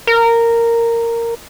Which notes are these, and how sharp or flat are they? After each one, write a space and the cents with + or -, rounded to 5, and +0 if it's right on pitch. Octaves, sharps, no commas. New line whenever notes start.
A#4 -10